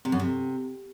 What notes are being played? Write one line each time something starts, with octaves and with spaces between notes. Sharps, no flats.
C3
F#2
C3